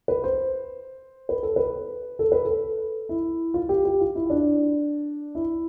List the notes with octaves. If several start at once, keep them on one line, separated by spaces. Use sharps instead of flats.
B4
C5
B4
A4
B4
A4
B4
A4
E4
F4
G4
G4
F4
E4
D4
E4